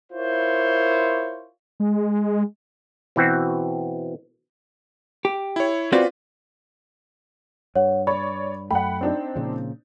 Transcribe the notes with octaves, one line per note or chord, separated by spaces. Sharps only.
E4 F4 A#4 C5 C#5
G#3
B2 E3 C4 F#4
G4
E4 C#5
C4 F4 F#4 B4 D5
G2 C#5 F#5
C#5 D5 B5
F#2 A3 F#5 G5 B5
C4 D4 D#4
A#2 C#3 F3